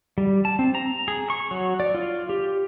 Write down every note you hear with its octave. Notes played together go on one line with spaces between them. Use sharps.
G3
A5
C4
A#5
G#4
C#6
F#3
D5
F4
G4